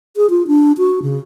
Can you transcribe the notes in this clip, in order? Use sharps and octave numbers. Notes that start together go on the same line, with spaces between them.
G#4
F4
D4
F#4
C#3